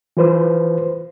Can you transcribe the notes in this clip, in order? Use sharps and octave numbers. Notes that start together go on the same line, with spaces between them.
E3 F4 B4 C5